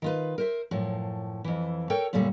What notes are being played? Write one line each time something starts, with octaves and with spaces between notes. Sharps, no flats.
D#3 F4 B4
A#4 C5 E5
F#2 A2 F3
F2 E3
A4 A#4 C#5 G5
F#2 A#2 D3 G3 A3